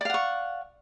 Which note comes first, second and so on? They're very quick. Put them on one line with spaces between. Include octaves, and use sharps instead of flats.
D5 F5 F#5 C#6